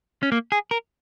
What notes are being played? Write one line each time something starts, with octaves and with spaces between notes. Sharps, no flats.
C#4
A#3
G#4
A#4